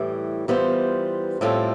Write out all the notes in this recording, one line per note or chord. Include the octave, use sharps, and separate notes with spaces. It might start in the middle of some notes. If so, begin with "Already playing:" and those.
Already playing: A2 E3 G3
E3 G3 B3 F4 C5
A2 G3 C4 F4 A4